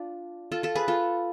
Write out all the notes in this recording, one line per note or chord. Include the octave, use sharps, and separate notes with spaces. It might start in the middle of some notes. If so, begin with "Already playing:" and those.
Already playing: D4 F4
F4 A4
F4 A4
G#4 B4
F4 A4